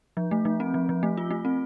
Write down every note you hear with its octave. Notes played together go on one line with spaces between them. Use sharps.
F3
A3
F3
C4
F3
F3
A3
F4
A3
C4